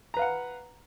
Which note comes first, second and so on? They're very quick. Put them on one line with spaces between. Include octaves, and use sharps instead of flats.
A#5 B4 F5 F#5